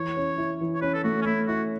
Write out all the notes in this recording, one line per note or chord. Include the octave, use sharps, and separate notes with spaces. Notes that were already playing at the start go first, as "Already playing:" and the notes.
Already playing: E3 C#5
C#4
E4
E3
C#5
C#4 B4
A4
A3 F#4
C#4
A3 E4
E4 F#4